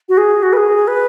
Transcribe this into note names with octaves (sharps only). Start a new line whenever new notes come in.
F#4
G#4
F#4
B4
G#4
B4